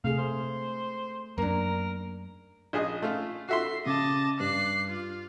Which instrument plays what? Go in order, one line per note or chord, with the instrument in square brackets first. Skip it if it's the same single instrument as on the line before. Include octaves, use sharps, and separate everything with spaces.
[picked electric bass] C3 [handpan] A3 G#4 [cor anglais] F5
[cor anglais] C5
[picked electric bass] F#2 [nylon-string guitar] A#3 D4 [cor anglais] A#4
[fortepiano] A#1 G#4 D#5
A3 F4
[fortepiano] F#4 E5 C6 [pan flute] A4 [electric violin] C7
[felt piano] C#3 [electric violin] D#5 A5 [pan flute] D6
[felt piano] G2 [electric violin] F#6 C7
[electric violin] F4